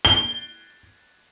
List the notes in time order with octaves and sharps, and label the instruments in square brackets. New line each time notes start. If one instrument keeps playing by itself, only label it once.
[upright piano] G7